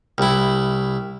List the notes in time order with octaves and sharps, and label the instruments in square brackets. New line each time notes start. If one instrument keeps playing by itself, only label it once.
[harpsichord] C2 E4